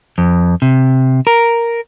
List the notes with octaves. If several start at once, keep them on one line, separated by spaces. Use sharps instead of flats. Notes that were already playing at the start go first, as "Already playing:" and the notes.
F2
C3
A#4